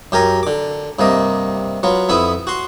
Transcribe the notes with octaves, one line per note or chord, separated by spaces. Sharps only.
F#2 G4 A#4 G#5 A#5
D3 D6
G2 C3 A#3 D#5
F#3 B3 F4
F2 B3 E4 E5 D#6
F#4 C6